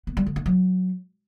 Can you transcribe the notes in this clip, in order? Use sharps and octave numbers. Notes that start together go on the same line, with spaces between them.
B3
G3
D3
D4
F#3